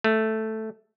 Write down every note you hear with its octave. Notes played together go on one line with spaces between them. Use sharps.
A3